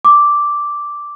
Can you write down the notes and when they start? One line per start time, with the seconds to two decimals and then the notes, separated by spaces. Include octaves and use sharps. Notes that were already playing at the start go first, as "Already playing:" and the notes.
0.05 D6